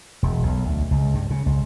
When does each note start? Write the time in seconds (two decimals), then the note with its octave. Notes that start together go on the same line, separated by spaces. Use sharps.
0.23 E1
0.43 B1
0.65 D2
0.91 C#2
1.14 G2
1.30 C#3
1.46 C#2